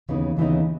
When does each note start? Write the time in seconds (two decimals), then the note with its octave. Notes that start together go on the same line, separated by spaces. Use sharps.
0.09 D#2 C#3 E3 B3 D#4
0.37 D#2 C#3 E3 B3 D#4